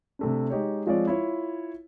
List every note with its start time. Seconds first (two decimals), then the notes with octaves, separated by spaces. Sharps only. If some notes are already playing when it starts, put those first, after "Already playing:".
0.19 C3 A3 D4
0.50 G#3 D#4 G4 C#5
0.87 F3 G#3 C4 F4 C#5 D5
1.07 E4 F4 C#5